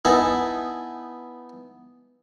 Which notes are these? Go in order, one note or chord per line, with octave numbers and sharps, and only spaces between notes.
B3 D#4 E4 G#5 A5